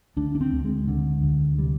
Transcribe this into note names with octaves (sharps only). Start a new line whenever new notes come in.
D2 D4
D4
C4
D2
G#3
D3
D2
C3 G3